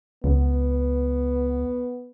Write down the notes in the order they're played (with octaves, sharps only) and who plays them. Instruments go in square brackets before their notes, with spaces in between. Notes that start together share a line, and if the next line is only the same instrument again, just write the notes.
[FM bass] C#2 [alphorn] B3